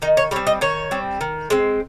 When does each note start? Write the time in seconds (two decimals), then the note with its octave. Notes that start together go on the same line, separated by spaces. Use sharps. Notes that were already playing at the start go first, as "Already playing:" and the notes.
0.02 D#3 D#4
0.17 C#5
0.31 G3 C#5
0.36 C4
0.47 D#5
0.61 D#3 C#5
0.91 G3 C4
1.21 D#3
1.50 G#3 C4